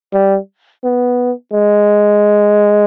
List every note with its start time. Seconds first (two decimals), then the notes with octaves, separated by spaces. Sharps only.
0.13 G3
0.84 B3
1.53 G#3